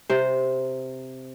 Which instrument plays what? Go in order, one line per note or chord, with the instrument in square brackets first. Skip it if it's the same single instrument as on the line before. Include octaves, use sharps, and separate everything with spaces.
[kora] C3 C5